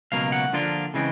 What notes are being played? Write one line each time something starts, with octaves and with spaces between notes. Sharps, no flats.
C#2 B2 F#3 A#3 F5
F#5
D3 F3 A#3 D4 F4
C#3 E3 G#3 C4